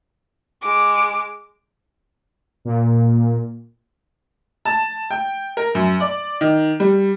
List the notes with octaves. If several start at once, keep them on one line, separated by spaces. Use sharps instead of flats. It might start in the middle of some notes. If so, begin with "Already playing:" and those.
G#3 D6
A#2
A5
G5
A#4
F#2
D5
D#3
G3